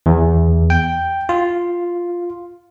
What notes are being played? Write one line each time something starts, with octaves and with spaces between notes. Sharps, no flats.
E2
G5
F4